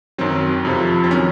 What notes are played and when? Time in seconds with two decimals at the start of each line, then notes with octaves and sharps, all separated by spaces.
0.18 F#2 D#3 F#3 C4
0.65 F2 C3 F3
1.04 C4
1.11 D#3 F#3 C#4